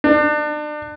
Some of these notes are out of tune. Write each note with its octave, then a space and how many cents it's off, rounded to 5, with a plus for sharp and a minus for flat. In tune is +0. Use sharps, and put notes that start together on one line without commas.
D4 +35